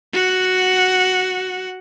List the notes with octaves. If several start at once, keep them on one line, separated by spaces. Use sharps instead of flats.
F#4 F#5